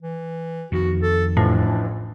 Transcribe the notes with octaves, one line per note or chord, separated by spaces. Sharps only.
E3
F2 D#3 F#4
A4
A1 A2 E3 F3 D4